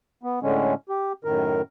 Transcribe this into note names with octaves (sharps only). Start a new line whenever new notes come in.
B3
A2 D3 G#3 C#4
G4
F#2 A2 D#3 A#4